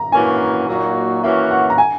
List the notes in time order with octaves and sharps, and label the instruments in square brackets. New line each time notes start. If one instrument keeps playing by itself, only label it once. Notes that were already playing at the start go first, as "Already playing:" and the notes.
Already playing: [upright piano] A#5
[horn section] E3 A#3 C#4 F#4 [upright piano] G#5
[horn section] A#2 F#3 A#3 D#4 F#4
[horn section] E3 A#3 C#4 F#4 [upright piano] E5
[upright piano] F#5
A#5
G#5